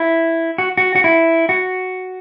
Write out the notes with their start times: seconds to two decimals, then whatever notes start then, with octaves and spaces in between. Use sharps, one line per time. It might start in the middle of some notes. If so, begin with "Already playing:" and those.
Already playing: E4
0.58 F#4
0.77 F#4
0.96 F#4
1.04 E4
1.49 F#4